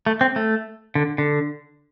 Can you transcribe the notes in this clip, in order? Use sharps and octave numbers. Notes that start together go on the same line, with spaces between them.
A3
C4
A3
D3
D3